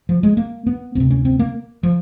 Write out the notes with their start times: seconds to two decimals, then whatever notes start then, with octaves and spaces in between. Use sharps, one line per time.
0.09 F3
0.23 G#3
0.37 A#3
0.67 B3
0.95 D2 C3 C4
1.11 C#4
1.25 C4
1.39 A#3
1.83 F3